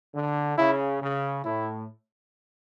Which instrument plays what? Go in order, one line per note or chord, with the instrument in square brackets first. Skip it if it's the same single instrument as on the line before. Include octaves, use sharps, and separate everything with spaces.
[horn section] D3
[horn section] C#3 [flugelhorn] E4
[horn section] C#3
[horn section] A2 [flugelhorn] E4